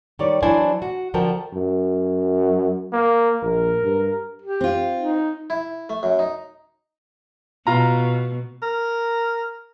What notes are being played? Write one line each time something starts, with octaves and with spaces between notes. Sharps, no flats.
D#3 G3 C#5 D5
E3 F#3 D4 E4 C5 G#5
F#4
D3 F3 F#4 A#4 G5
F#2
A#3
A#1 A#4
G2
G4
C4 F4
D#4
E4
A3
F#2
D#4
B2 F4 A#5
A#4